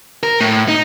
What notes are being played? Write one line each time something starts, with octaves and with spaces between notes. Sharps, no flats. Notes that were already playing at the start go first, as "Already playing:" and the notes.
A#4
A2
D#4